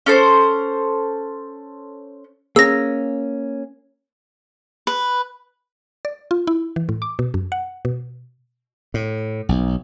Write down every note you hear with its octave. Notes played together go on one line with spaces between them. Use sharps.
C#4 A4 C5
A#3 C#4 G#4 E6 A#6
B4
D5
F4
E4
E3
A2
D6
B2
F#2
F#5
B2
A2
B1